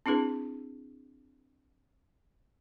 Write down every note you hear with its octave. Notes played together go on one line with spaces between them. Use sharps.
C4 D4 E4 G#4 B4